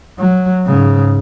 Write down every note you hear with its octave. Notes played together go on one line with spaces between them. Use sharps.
F#3
G#2 C#3